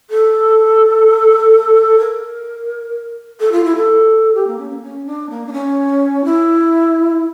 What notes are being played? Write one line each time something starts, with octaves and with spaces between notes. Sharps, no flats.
A4
A#4
A4
F4
E4
A4
G4
A#3
C#4
A#3
C#4
D4
A#3
D4
C#4
E4